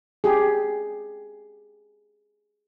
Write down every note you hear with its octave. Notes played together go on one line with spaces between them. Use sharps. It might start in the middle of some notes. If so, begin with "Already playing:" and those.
G4 G#4